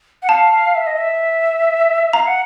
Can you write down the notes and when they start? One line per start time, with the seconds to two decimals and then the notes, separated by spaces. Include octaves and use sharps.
0.22 F#5
0.28 F5 A5
0.75 E5
0.87 D#5
0.98 E5
2.13 F5 A#5
2.27 F#5